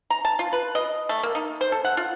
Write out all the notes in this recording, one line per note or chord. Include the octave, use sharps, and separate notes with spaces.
A#5
A5
F4
B4
D#5
A3
A#3
D#4
C5
A4
F#5
F4